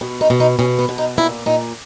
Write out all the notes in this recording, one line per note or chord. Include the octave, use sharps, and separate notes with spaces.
B2
D#4
B2
D#4
B2 C#4
B3
B2
D#4
A#2 E4
A#2 D#4